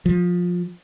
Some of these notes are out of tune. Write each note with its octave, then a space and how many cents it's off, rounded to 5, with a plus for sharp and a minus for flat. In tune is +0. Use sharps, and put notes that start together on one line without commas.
F3 +20